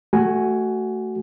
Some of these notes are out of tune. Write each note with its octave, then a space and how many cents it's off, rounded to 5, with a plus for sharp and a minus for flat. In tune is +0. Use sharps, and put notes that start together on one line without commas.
A3 +0 F#4 +15 G#5 +0